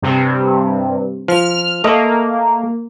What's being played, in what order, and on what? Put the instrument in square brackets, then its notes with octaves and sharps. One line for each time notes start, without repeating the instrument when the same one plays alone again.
[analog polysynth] G2 C3
[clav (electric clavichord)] F3 [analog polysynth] F6
[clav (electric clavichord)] A3 D#5 [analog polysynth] A#3